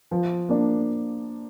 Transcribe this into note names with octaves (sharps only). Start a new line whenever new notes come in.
F3
A#3 D4